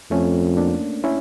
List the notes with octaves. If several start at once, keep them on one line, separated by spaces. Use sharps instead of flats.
F2 A3 C#4
A#3 D4
C#4 E4